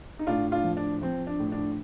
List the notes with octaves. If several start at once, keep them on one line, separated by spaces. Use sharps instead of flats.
D#4
A2 D4 F4
D4 F4
F3
D4
F3 C4
D4
A2
D4